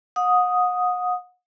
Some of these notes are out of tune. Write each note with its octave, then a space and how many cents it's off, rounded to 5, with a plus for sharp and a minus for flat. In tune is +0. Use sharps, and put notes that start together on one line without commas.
F#5 -35 D#6 +0